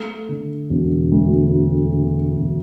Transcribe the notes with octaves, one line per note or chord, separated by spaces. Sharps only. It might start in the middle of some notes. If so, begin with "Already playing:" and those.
Already playing: A3
D3
E1
D2
A3
D3
E1